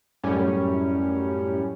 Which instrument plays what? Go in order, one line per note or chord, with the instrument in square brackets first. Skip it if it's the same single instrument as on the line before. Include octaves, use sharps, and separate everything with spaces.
[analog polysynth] F#2 A2 G3 C#4